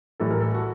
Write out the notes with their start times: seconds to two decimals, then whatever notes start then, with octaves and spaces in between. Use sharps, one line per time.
0.20 A2 E3 G3 A4
0.31 A#4
0.41 A4
0.54 F#4